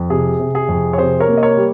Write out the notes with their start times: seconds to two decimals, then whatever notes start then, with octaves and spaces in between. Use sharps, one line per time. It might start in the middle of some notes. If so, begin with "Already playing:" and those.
Already playing: F2
0.10 C3 G#4
0.40 C3
0.55 G#4
0.69 F2
0.93 C#5
0.98 C3 G#4 C5
1.20 A#4 C#5
1.28 A#3
1.37 D#5
1.43 A#4 C#5
1.57 G3